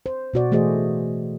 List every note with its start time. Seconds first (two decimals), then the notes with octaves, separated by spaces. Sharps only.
0.06 C5
0.34 B2 F#4 D5
0.52 E3 A3 F#4 G#4 C5 D#5